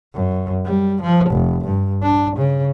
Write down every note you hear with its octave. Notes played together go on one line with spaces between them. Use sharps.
F#2
G3
F3
F1
G2
D4
C#3